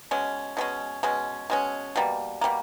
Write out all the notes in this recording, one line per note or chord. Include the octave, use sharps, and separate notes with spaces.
B2 G#3 C#4
B2 G#3 C#4
B2 G#3 C#4
B2 G#3 C#4
B2 G3 A#3
B2 G3 A#3